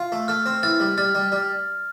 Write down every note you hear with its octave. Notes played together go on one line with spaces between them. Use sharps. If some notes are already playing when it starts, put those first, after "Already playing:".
Already playing: F4
A3
A3 F6
C4
E3 F6 A6
G3
G3 F6 A6
G3
G3